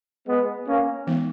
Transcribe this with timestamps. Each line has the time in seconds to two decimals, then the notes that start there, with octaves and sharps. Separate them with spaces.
0.27 G#3 B3
0.67 A#3 C#4
1.07 E3 G#3 B3 D#4